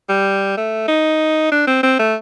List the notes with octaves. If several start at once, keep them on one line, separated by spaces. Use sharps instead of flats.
G3
A3
D#4
D4
C4
C4
A3